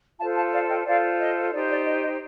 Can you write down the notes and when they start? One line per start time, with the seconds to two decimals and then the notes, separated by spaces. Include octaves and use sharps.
0.19 F4 A4 C5 F5 A5
0.36 F5 A5
0.52 D5 F5
0.69 D#5 G5
0.86 F4 A4 C5 D5 F5
1.20 D#5
1.53 D#4 G4 C5 D5
1.70 D5
1.87 D#5
2.03 D#5